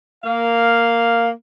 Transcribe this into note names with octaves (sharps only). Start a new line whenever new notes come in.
A#3 F5